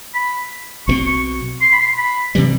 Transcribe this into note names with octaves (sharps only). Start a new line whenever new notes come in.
B5
B1 B2 G3 C4 C#6
C#6
C6
B5
C6
B5
C3 E3 G3